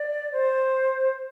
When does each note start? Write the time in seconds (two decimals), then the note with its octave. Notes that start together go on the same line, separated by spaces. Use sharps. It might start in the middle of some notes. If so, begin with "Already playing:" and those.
Already playing: D5
0.33 C5